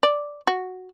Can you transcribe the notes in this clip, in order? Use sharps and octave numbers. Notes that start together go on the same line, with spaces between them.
D5
F#4